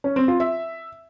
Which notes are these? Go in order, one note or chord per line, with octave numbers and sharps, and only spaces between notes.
C#4
C4
F4
E5